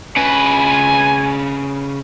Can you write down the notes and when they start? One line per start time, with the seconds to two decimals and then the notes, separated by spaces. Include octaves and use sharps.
0.16 C#3 B4 G#5